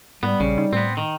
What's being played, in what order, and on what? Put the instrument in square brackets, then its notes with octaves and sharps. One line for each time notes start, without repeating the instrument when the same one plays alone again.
[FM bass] G#2 [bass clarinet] G3 [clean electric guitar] B3
[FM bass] A#1 [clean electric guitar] C#3
[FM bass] D#4
[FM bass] A2 [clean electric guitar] B3 C4
[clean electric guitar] D#3